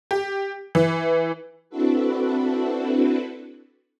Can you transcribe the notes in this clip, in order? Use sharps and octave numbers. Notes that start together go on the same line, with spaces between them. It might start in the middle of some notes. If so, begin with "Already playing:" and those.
G4
E3
C4 D4 E4 F#4 A4 B4